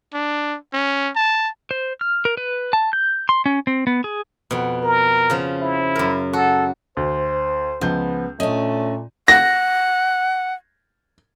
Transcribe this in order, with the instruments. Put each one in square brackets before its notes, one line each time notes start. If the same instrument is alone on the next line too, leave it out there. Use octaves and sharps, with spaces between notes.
[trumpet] D4
C#4
A5
[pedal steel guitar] C5
F6
A#4
B4
A5
G6
C6
C#4
C4
B3
G#4
[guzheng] F2 B2
[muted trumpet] A#4
[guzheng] C#3 F3
[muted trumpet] E4
[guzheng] F#2 A#4
[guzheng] F#4 [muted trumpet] A4
[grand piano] D2 [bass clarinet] C5
[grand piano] C#2 G6 [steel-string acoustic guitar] F3 [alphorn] B3
[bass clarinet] A#2 [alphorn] A3 [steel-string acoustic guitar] C#4 D4 [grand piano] D#5
[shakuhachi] F#5 [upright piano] A#6